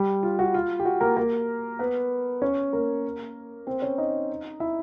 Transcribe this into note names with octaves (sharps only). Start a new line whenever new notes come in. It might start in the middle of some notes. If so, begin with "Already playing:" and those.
Already playing: G3 G4
F4
F#4
F4
G4
F#4
A#3 A#4
A#3 A#4
B3 B4
C#4 C#5
A#3 A#4
C4 C5
C#4 C#5
D#4 D#5
E4 E5